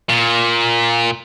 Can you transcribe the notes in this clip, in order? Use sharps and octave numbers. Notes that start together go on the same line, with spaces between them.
A#2